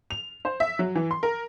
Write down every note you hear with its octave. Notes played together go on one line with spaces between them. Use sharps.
F7
C5
E5
F#3
E3
C6
A#4